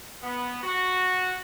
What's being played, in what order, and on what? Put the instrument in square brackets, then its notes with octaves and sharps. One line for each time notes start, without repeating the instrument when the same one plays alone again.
[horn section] B3
F#4